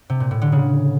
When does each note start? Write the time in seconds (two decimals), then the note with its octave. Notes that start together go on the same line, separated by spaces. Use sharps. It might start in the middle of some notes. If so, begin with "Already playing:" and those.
0.10 C3
0.20 A#2
0.31 A2
0.42 D3
0.52 C#3